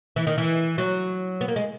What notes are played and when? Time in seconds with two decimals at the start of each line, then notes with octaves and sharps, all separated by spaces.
0.16 E3
0.27 D#3
0.38 E3
0.78 F#3
1.41 B3
1.48 A#3
1.56 G#3